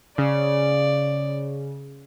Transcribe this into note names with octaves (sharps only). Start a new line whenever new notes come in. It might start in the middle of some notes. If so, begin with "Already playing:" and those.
C#3 D5